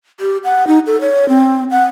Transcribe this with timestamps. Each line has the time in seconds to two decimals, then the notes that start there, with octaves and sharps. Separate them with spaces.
0.20 G4
0.44 F#5
0.67 D#4
0.87 A4
1.01 C#5
1.29 C4
1.71 F#5